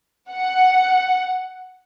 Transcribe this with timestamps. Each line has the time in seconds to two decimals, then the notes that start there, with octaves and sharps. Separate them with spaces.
0.32 F#5